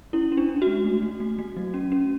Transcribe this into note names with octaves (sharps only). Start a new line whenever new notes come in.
C#4 E4
C#4
D4
C#4
G#3 F#4
A3
A3
A3
A3
F#3
C#4
C#4